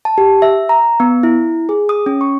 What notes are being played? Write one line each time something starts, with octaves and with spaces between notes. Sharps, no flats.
A5
G4
E5
A#5
B3
E4
G#4
D#6
C#4
C#6